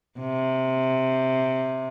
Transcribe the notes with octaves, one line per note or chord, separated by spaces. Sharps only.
C3